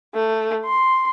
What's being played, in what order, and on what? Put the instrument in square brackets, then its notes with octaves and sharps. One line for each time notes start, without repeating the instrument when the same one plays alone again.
[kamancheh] A3
C6